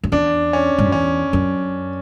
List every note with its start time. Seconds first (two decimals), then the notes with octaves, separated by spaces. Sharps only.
0.03 F#2
0.12 E2 D4
0.53 C#4
0.78 G#2
0.85 F#2
0.92 E2 C#4
1.33 F#2